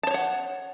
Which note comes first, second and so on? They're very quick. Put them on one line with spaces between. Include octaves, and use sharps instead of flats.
A5 C5 C#5 F#5